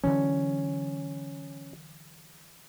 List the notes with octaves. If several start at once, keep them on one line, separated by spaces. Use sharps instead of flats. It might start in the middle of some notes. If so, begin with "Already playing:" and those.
D3 E3 F#3 C#4